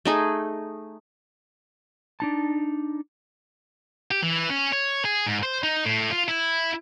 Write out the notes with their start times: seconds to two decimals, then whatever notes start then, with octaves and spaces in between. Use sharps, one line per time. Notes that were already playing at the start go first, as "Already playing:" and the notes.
0.05 A3 D#4 G#4
2.20 D4 D#4 A5
4.11 G4
4.22 E3
4.50 C#4
4.72 C#5
5.05 G#4
5.27 G#2
5.43 C5
5.63 D#4
5.85 A2
6.11 F4
6.28 E4